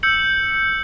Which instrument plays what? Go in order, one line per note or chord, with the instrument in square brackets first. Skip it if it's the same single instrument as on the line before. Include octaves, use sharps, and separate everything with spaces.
[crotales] E6 G6 C#7 F#7